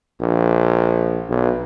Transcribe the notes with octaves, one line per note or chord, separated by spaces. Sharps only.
A#1
B1